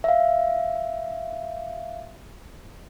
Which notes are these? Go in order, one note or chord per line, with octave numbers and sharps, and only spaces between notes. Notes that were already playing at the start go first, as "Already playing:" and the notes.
E5 F5